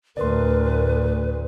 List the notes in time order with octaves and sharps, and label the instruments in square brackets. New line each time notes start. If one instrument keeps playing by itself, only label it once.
[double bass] D2 A2 [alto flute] A#4 [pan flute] B4 [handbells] D5 C6